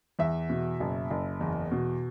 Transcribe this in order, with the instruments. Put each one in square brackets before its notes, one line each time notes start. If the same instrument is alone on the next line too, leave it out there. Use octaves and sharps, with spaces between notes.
[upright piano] E2 E5
B2
F#1
F#1
E2
B2